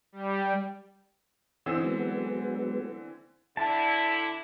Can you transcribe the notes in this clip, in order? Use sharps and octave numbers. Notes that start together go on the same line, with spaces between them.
G3
D3 E3 C4 D#4 C5 E6
F#3 G#3 B3
D3 E4 A5